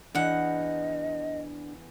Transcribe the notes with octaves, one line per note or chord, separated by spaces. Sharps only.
E2 D4 D#5 F#5